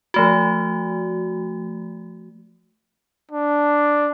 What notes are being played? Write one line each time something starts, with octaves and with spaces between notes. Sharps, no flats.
F3 A3 F#4
D4